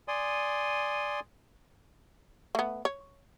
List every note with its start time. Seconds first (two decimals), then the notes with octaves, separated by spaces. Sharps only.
0.08 D5 G#5 C6 D#6
2.55 A3 B3
2.85 C#5